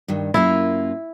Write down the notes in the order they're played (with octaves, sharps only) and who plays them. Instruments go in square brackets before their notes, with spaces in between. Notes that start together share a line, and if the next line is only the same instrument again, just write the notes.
[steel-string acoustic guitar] G2 D#3
[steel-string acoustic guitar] F#2 A#3 F4 [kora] E4